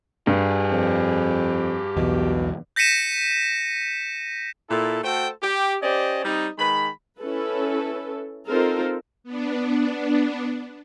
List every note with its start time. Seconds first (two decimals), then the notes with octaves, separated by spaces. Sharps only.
0.27 G2 G4 G#4
0.71 F2
1.97 B1 E2 B2
2.76 G6 A#6 B6 C#7 D#7 E7
4.70 A#2 E4 A4
5.04 A3 F#4 A4 C5 G5
5.42 G4
5.83 C#4 G4 C5 D5 D#5
6.24 G3 C4 D#4
6.58 D#3 G#3 B5
7.19 C#4 E4 A4 B4
8.48 C4 D#4 F4 A4 A#4 C5
9.24 B3 D4